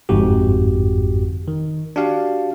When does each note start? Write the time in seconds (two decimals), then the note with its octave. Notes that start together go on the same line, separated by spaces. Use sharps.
0.09 G1 F2 G#2 F#4 G4
1.48 D#3
1.96 D4 F#4 G4 F5